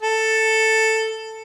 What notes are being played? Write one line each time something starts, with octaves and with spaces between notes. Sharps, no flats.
A4